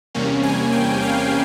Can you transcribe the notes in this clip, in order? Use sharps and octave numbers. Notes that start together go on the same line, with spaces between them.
E2 C3 G3 A#3 C#4
G#5
G5
F5